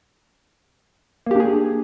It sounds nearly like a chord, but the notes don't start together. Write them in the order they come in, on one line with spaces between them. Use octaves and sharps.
A#3 G4 D4 G#4